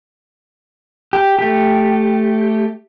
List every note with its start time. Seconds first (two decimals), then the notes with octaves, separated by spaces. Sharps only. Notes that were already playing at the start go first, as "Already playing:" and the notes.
1.13 G4
1.39 A3 G4